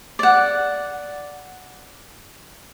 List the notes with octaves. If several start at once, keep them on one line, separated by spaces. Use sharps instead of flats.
D5 F#5